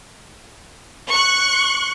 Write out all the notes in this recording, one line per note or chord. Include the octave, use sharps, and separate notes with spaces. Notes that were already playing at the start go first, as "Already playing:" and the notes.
C#6 F#6